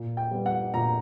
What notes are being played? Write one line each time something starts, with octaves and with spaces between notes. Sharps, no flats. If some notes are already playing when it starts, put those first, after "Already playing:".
Already playing: A#2
G5
G3 B3
F#5
A#2 A#5